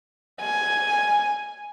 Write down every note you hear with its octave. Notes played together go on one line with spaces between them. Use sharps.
G#5